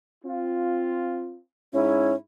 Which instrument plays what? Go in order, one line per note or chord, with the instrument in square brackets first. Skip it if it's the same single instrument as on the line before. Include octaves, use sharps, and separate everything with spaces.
[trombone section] C4 F4
[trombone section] G#2 E4 [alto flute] C#4